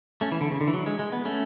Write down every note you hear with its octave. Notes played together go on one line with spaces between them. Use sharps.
A3 C#4
E3
D3
C#3
D3
E3
F#3
G#3
G#3
B3
A3 C#4